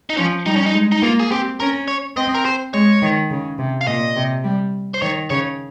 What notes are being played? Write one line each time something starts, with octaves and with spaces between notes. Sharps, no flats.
D#4
F3 C#4
G3 D#4
C#4
D#4
G#3
D#4
A#3 F4
G#4
C4 G4
C#4 A#4
C#5
C4 D#5
A#4
C5
G#3 C#5
D#3
C#3
C3
F5
A#2 D#5
C3
G3
C5
D#3 C#5
C#3 C#5